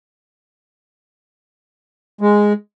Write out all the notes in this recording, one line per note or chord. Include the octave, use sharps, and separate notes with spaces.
G#3